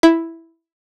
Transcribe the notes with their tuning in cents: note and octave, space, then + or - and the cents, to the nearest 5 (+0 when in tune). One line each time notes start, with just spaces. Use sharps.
E4 +0